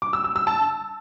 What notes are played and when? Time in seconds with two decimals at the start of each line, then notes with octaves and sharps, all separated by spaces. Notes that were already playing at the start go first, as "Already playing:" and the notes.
0.02 D6
0.13 E6
0.24 E6
0.36 E6
0.47 A5